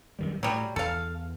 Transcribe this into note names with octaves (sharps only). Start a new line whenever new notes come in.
F#2 D#3 G3
A2 F#3 G3
E2 A4 F5